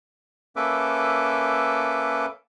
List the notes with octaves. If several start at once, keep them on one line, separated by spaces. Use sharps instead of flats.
A#3 C#4 A4 B4 E5 D6